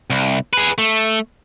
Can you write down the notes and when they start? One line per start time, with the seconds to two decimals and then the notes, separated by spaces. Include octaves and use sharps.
0.10 C2
0.53 G#4 B4
0.78 A3